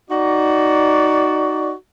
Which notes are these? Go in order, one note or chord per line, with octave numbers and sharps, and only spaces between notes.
D#4 F#4 D5